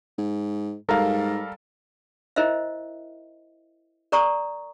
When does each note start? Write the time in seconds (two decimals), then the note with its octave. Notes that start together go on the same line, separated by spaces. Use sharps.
0.18 G#2
0.89 G#2 G3 A4 A#4 F5 A#5
2.36 E4 A#4 C5 D#5 E5
4.12 A#4 D5 A#5 C#6 D#6